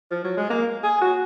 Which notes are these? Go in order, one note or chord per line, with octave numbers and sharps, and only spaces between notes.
F3
F#3
G#3
A#3
G#4
F#4